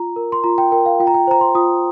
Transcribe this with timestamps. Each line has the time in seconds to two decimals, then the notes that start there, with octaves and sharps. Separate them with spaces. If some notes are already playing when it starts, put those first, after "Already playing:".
Already playing: F4 A#5
0.16 A#4
0.32 C6
0.44 F4 A#5
0.58 G5
0.72 A#4 G5
0.86 F5
1.00 F4 G5
1.07 A#5
1.14 G5
1.27 C5 A#5
1.41 C6
1.55 F4 D#6